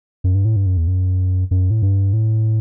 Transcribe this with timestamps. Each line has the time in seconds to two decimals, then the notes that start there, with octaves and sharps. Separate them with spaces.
0.24 F#2
0.35 G2
0.45 A2
0.56 G2
0.66 F#2
0.77 E2
0.87 F#2
1.51 F#2
1.71 A2
1.82 G2
2.13 A2